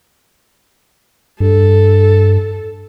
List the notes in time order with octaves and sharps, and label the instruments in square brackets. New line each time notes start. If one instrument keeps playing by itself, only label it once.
[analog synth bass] G2 [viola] A4